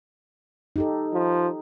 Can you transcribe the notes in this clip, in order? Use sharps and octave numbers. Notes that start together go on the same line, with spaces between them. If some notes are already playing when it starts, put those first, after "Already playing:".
D#4 G4 A4
F3